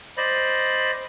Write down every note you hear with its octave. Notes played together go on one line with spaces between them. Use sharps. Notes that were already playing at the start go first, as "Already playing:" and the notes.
C5 D5 D#5 B5